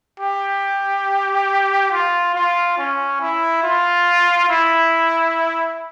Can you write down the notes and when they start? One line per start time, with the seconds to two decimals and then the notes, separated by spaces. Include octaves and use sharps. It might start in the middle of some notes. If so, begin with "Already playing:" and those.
0.20 G4
1.92 F4
2.35 F4
2.78 C#4
3.21 E4
3.64 F4
4.49 E4